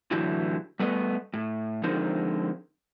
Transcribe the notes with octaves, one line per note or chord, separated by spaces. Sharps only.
A2 D3 E3 F#3 E4 G4
G3 A3 B3 D#5
A2
D3 F3 G#3 C4 D#4 A#4